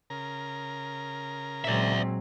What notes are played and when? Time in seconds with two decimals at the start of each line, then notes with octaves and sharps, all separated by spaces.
0.10 C#3 A#4 A#5
1.64 A#2 F#3 G#3 C4 D5 E5